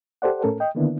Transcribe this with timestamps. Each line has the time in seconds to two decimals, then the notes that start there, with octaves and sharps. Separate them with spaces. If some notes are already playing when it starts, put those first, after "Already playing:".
0.22 G4 A4 C5 D5 F#5
0.43 A2 A3 C#4 A4 A#4
0.60 D#5 G5
0.75 D3 D#3 A#3 B3 D4 E4